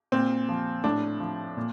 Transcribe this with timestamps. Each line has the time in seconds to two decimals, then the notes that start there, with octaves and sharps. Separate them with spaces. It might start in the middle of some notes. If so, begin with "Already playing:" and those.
0.12 A#2 C4
0.49 F3
0.84 A2 D4
1.20 F3
1.57 A#2